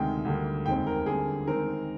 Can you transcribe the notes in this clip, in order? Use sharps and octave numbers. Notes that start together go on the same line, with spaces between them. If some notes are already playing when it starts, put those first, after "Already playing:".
Already playing: D2 C3 D#3 G#3 G5
D2 D3 G3 A#3
F1 D#2 D#3 G#3 C4 G5
A#4
F2 D3 G3 A#3 G#4
D#3 G#3 C4 A#4